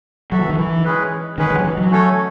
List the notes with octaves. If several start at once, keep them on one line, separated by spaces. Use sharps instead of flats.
F#3 F#4 A4 E5
E3
D#3
E3
G#3 C#4 G#4 B4
D#3 G#3 C#4 G#4 B4
D#3
F#3
E3
F#3
A3 C#4 F#4 A4 C#5